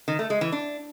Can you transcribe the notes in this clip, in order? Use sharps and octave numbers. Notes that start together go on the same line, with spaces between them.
D#3
A3
G#3
E3
D4